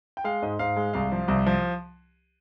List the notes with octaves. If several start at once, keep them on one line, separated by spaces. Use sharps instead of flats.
G5
G#3 F5
G#2 D#5
G#2 F5
G#3
C2 F5
F3
C2
F3